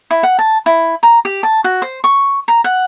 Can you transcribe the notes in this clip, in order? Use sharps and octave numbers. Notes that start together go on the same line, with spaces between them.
E4
F#5
A5
E4
A#5
G4
A5
F#4
C5
C#6
A#5
F#5